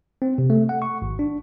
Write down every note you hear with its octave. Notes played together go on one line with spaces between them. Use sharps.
C4
C3
A3
F#5
C#6
G#1
D4